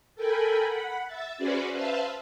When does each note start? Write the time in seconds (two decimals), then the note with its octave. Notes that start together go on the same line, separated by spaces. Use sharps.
0.15 A4 A#4 G5 G#5 B5
0.67 F#5 B5
1.07 E5 A6
1.38 C#4 F#4 G#4 B4 C5 D5
1.72 B4 C5 E5 F5 A5